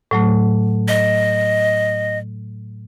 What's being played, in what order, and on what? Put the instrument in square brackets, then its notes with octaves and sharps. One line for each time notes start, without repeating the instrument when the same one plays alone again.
[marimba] A2 F#3 A3
[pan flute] D#5